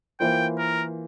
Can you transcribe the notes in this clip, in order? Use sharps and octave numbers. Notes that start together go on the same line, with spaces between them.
E3 A#3 F4 C5 G5
A#4